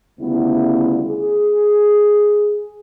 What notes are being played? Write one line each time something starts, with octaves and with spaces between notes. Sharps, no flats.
D2 C#3 G3 B3 E4 F4
G#4